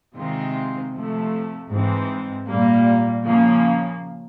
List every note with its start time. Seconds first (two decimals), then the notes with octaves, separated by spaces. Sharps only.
0.15 C3 D#3 G#3 C4 F4
0.93 C3 F3 A3
1.70 G#2 E3 G#3 C4
2.47 A#2 G3 A#3
3.24 C#3 F3 A#3